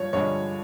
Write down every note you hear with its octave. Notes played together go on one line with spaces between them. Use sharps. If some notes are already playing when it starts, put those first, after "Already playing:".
Already playing: G2 F3 C#5
G2 D3 F3 G#3 C#5